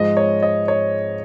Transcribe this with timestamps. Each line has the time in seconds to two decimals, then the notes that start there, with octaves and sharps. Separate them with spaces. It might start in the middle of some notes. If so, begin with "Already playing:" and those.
Already playing: G#2 F3 G#3 D#5
0.17 C#5
0.42 D#5
0.68 C#5